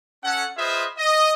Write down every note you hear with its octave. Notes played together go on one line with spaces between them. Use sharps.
C#4 A4 F#5
F4 G#4 B4 C5 D#5 E5
D#5